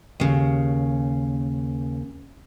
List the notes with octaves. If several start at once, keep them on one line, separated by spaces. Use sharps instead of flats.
D#2 C#3